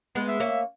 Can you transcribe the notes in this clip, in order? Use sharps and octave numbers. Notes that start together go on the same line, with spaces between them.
G#3 B3
E5
A#3 C#4